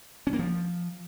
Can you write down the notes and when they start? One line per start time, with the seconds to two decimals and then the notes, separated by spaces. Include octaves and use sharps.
0.27 C#4
0.33 A#3
0.39 F3